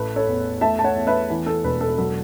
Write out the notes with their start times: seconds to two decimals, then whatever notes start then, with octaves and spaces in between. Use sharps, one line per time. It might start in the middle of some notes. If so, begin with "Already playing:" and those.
Already playing: A1 A3 B4
0.16 A4 C#5
0.28 E2
0.61 A3 E5 A5
0.79 A5
0.84 C#5 F#5
0.95 E2
1.07 B4 E5
1.30 E3
1.46 A4
1.64 E1 B4
1.81 A4
1.98 F#3 A4